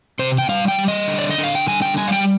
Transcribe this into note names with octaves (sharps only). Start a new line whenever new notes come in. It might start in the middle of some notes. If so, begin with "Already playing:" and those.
C3 C5
G5
G3 F5
G5
G3
D#5
D3
D5
D#5
D3
F5
G5
G3 G#5
G5
G3 G#5
F5
G5